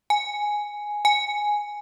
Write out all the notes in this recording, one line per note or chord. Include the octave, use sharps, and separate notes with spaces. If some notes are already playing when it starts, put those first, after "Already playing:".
G#5
G#5